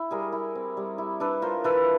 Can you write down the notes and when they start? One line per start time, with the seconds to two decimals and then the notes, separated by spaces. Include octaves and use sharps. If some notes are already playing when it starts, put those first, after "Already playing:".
Already playing: E4
0.11 G3 G#4 A#4
0.32 E4
0.55 C4
0.77 G3
0.98 E4
1.20 D4 A4 B4
1.42 F4 A#4 C5
1.64 E3 A4 B4